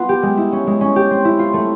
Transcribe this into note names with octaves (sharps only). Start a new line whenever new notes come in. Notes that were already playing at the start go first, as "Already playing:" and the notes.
Already playing: B3 F4
G4
G#3
E4
C#4
G#3
C#4
G4
C4
E4
F4
A3